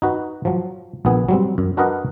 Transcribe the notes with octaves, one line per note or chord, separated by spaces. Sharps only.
D#4 F#4 B4
F3 F#3
A#1 A#2 B3 G#4
F#3 G3 C4
F#2
D4 F#4 A#4 B4 D#5 F#5